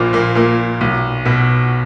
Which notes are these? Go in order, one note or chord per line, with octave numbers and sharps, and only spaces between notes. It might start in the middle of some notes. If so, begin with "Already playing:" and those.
Already playing: A#1 A#2 A#3
A#2 A#3
A#2 A#3
B1
B2